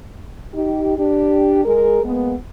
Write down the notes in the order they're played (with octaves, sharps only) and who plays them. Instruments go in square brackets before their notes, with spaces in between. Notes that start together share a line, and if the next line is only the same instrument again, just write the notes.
[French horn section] D#4 G4
D4 G4
G#3 G#4 A#4
G#3 A#3 B3